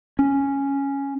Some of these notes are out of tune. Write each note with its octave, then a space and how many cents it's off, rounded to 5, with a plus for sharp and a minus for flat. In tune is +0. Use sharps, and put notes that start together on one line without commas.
C#4 +0